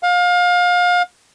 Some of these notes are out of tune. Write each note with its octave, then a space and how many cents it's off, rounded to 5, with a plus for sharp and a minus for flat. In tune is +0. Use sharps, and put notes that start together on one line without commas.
F5 +30